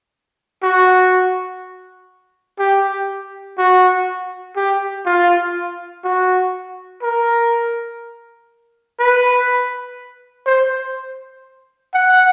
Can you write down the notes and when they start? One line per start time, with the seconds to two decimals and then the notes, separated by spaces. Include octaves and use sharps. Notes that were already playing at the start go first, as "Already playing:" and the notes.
0.63 F#4
2.59 G4
3.58 F#4
4.56 G4
5.06 F4
6.04 F#4
7.02 A#4
8.99 B4
10.46 C5
11.94 F#5